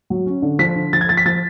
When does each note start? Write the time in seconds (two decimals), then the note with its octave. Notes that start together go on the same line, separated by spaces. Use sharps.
0.10 F#3
0.26 C#4
0.42 D3
0.59 F3 B6
0.75 D3
0.93 F3 A6
1.01 G#6
1.09 F3 A6
1.17 B6
1.25 F3 A6